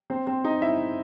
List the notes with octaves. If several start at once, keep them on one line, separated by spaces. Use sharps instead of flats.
C4 C5
C4 C5
D#4 D#5
E4 E5